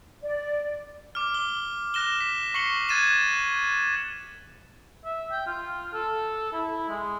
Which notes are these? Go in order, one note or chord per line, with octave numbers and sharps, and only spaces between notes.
D5
D6 F6
G7
F6 F#6 A#6 E7 G7
B6
C#6 C7 C#7 F#7 G7
F#6 G#6 A6 D#7 E7
E5
G5
F4
A4
E4
G#3